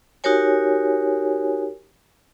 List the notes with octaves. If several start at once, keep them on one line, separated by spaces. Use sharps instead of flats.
D#4 F#4 G4 A#4 C#5 G#5